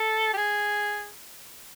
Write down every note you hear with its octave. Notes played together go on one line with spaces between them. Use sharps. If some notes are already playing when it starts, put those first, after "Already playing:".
Already playing: A4
G4
G#4